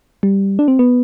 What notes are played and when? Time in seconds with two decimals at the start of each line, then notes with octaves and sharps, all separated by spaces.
0.23 G3
0.59 D4
0.68 C4
0.79 B3